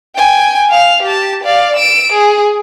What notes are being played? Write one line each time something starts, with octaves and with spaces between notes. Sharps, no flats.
G5 G#5
F5 F7
G4 A5
D5 F5
E6 D7
G#4